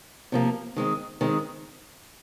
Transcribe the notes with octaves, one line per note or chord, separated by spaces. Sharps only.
C3 F3 A#3
D#3 G#3 C4
D#3 G#3 C4